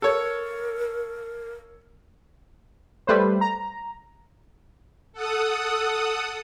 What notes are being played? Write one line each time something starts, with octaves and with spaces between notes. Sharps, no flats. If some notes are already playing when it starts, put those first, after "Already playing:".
A4 A#4 C#5
G3 A3 B4 C5
A#5
A4 F#5 D#6